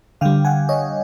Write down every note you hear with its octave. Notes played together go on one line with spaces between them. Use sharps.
D3 G3 F5 G5
F#5 G#5
C#5 D#5